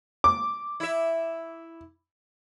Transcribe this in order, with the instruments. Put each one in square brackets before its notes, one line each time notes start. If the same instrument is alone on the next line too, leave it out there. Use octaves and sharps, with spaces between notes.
[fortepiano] D6
[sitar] E4 E5